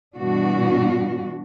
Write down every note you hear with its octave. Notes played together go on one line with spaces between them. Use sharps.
G2 B2 E3 D4 F#4